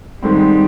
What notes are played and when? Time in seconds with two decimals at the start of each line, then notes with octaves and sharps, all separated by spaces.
0.22 G#2 D#3 G3 G#3 C4